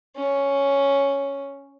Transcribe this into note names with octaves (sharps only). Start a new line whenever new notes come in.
C#4